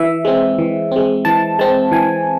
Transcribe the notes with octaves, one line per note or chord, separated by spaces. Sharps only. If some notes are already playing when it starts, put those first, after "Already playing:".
Already playing: E3 E5
G#3 C4
E3
G#3 C4
E3 A5
G#3 C4 A5
E3 G#5